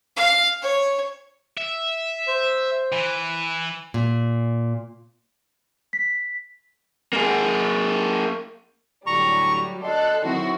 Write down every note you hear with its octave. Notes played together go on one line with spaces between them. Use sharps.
F5
C#5
E5
C5
E3
A#2
B6
A#3 G#4
A2 D3 F#3 G3 A#5 C#6
D2 A4 D5 D#5 C6 F#6
D#3 F#3 C4 E4 F#4